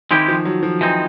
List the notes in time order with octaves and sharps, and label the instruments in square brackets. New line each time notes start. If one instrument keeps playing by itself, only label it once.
[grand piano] D#3 [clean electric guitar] G#3 C4 E4 G4
[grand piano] F3
F#3
F3
[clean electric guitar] E3 G#3 C4 D#4